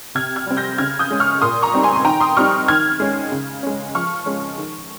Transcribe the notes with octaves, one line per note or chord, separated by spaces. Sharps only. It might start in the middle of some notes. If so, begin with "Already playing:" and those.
C3 F6 G#6
F6 G#6
G3 C4
G6 A#6
C#3 F6 G#6
D#6 G6
G#3 C#4
C#6 F6
A#2 C6 D#6
A#5 C#6
G3 C4 D#4
G#5 C6
C6
D#3 G5 A#5
C6 D#6
G3 C4 D#4 C#6 F6
D#3 F6 G#6
G#3 C#4
C#3
G#3 C#4
F3 C#6 F6
G#3 C#4
D#3